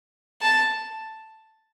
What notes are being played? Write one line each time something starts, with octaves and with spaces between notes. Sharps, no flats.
A5